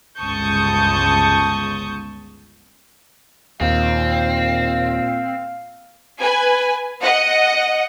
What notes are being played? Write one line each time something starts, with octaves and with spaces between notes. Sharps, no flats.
G1 C#2 A5 C#6 D#6 G6
D#2 A#2 C4 F5
B4 G#5
D#5 F#5